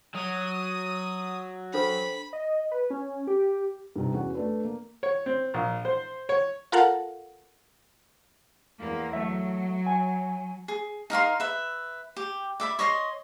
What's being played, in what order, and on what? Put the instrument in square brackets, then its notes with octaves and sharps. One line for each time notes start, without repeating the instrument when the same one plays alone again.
[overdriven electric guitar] F#3 [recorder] D#6
[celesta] D4 A4 C5 [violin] B5
[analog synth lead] D#5
B4
C#4
G4
[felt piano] G2 C3 D#4
E2 C#4 F#4
A3 D4 B4
A#3
[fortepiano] C#5
C4
A#1
C5
C#5
[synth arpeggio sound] F4 A4 A#4 F5 F#5 A5
[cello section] E2 A#3
[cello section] F#3 [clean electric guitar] A3 E5
[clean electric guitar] G#5
[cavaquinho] G#4
D#4 A#4 F5 C6
B4 E5
G4
D5 E5 B5
C#5 D#5 E5 C6